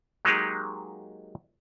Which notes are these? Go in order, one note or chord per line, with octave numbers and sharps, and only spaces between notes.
F#3 G#3 A#3 D#4 G4 G#4